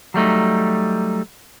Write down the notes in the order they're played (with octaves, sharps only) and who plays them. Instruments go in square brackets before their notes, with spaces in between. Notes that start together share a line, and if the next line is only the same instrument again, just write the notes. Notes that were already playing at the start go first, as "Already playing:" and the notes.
[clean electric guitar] F#3 G3 A3 D#4